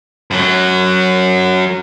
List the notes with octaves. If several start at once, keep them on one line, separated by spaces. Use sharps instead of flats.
F#2 F#3